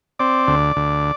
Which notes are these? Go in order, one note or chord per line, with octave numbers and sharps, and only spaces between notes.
C4 D5
D2
D2